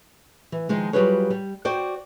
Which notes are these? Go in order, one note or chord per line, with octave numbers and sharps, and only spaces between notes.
E3
D#3 F3 G#3
F#3 G3 F4 G#4 B4 C#5
G3
F#4 C5 D5 G5